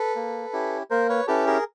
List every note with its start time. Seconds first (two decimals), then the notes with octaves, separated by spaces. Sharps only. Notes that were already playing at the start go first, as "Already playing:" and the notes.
Already playing: A4 B4
0.16 A#3
0.53 C#4 E4 G4
0.90 A#3 A#4 C5
1.09 B4 C#5
1.28 C#4 E4 G4 A4 B4
1.47 G#4 A#4